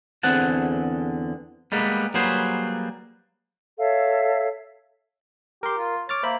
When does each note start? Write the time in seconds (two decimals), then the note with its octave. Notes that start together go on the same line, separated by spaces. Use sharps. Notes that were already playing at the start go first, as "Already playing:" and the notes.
0.23 E2 D3 C4 G#4 F#5 A5
1.72 G3 G#3 A#3 B3
2.14 F#3 G3 A#3 G#4 B4 C5
3.79 A4 C#5 E5 F5
5.63 G4 A#4 C6
5.78 F4
6.09 C#5 D6 F6 A6
6.23 A#3 C5 E5 B5